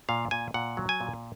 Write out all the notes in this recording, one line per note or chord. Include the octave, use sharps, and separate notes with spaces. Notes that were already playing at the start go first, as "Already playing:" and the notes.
A#2 F5
A#2 G#5
A#2 F#5
F#3
G#5
A#2